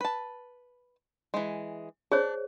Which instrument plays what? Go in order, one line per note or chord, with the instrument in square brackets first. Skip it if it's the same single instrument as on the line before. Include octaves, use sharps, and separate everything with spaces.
[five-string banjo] B4 A5
E3 G#3
[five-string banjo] D4 [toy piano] G#4 C5 C#5